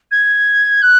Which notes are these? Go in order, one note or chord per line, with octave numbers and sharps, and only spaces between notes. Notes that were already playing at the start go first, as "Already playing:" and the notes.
G#6
F#6